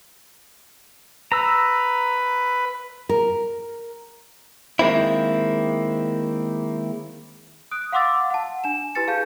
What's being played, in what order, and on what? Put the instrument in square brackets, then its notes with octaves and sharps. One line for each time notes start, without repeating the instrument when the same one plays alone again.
[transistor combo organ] B4 [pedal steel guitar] A#5 E6
[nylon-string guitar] A#4
[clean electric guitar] D#3 G#3 A#3 C4 E4
[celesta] D#6 F#6 D7
F5 F#5 C6 D6 E6 A6
F#5 A5
D4 G#5 E7
E4 G4 B4 G#5 A6 C#7
G#4 F5 A5 G6